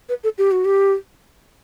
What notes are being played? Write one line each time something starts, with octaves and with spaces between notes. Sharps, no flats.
B4
A4
G4
F#4
G4